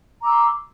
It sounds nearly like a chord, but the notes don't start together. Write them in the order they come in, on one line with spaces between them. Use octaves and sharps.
A#5 D6 E6 C6